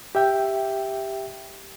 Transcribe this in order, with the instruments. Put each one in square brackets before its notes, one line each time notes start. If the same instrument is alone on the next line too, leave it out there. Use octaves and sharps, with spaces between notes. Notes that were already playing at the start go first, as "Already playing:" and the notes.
[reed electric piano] G4 E5 G5